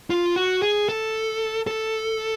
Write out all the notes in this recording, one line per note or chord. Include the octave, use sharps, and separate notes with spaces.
F4
F#4
G#4
A4
A4